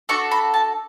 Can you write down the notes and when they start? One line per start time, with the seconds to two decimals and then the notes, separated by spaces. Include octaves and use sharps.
0.09 D4 F#4 A4 C#6
0.31 B5
0.54 A5